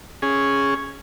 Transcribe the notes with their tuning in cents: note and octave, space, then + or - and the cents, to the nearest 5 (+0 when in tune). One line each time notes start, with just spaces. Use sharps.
C#4 +0 G#4 +0